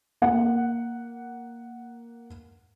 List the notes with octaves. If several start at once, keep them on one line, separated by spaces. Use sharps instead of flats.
A#3 F#5